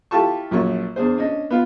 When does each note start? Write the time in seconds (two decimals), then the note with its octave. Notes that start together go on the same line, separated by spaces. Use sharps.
0.11 E4 F4 G4 A4 A5 C#6
0.51 A#1 F#2 C#5 C#6
0.96 E2 D4 G#4 C5
1.18 C#4 D4 D#5
1.50 B3 F4